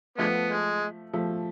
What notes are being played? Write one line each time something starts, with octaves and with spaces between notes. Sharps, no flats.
D3 F3 G#3 A3 B3
G#3
F3 A3